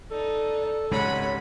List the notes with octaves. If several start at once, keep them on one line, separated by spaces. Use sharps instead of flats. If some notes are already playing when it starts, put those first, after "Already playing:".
D#4 A4 D5
C#2 G#2 C3 C#5 F#5 B5